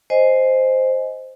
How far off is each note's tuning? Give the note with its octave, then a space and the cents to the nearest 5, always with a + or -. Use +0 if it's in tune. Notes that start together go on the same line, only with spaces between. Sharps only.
C5 +0 D#5 +0 G#5 +0